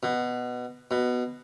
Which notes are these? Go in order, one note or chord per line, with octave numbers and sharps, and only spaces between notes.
B2
B2